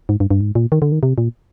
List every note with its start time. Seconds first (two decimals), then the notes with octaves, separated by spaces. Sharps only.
0.09 G#2
0.20 G2
0.31 G2
0.41 G#2
0.55 A#2
0.72 D#3
0.82 D3
0.92 D#3
1.03 C3
1.18 A#2